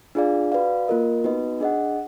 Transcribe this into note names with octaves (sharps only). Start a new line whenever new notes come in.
D4 F4 G#4 D5 F5
F#4 B4 D5 F5
A#3 F4 A#4 D#5
B3 D#4 F#4 B4 D#5
D4 G#4 D#5 F#5